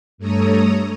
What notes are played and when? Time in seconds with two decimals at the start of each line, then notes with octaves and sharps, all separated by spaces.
0.18 G2 A3 A4 C#5 A#5 D#6